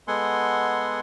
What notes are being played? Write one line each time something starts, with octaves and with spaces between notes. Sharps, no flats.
G#3 B3 A4 F#5 G#5 C6